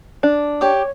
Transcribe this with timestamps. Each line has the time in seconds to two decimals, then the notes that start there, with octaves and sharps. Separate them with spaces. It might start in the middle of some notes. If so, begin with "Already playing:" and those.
0.23 D4
0.61 G4 C#5 D6